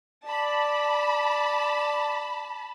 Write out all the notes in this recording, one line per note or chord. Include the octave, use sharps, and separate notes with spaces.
D5 A5 B5